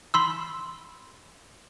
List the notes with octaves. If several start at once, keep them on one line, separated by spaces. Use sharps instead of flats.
B5 C6 E6